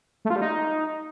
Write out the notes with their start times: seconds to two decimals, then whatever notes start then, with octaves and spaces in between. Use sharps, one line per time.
0.25 A3
0.30 F4
0.36 G3
0.41 D#4